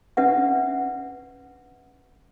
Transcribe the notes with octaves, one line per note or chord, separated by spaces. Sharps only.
C#4 D4 B4 E5 F#5